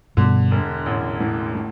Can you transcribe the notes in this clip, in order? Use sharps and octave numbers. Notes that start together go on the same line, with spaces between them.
G2 B2 D3
E1
A1
A2
A2